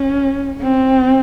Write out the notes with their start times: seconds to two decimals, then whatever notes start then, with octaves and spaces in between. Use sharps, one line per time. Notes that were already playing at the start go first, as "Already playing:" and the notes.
Already playing: C#4
0.61 C4